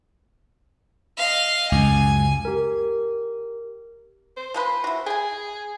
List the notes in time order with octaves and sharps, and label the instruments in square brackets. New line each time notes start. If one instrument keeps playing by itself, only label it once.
[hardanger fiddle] D#5 F5
[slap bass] C#2 F#2 [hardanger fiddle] G#5
[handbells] G4 A#4
[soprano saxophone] C5
[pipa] F3 G#3 B4
E4 F#4
[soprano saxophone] G#4 [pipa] G5 G#5